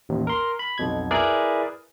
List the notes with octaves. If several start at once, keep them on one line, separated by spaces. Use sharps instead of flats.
A1 D#2
A#4 C6
B5
B1 F2 B2 G#6
E4 G#4 A#4 B4 D5